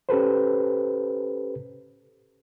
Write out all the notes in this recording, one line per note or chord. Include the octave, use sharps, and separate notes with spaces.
C#4 G4 A4 B4 C5